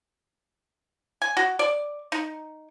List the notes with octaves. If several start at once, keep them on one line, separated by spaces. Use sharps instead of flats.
G#5
F#4
D5
D#4